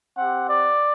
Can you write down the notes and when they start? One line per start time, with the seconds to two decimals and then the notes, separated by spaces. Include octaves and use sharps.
0.16 C4 G4 F#5
0.47 D5